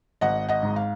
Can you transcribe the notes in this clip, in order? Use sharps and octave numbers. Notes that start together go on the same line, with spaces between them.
G#1 D#5 F#5
D#5 F#5
G#2
F5